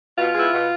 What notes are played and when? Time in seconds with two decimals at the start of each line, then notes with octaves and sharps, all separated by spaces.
0.18 B2 F4
0.35 G#3 B3 E4
0.52 B2